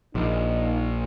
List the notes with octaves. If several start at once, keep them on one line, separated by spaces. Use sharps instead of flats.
A#1 D#4